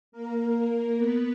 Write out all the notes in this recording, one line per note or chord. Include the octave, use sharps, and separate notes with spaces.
A#3 A#4
B3 B4